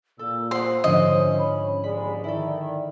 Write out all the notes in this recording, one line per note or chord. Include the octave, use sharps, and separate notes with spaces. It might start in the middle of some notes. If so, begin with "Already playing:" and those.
A#2 A4 E6
C5 F#5 C6 D#6
G#2 D3 F3 C#4 D#5
B5
D#2 G#2 G#3 D5 B5
D#3 E4 A4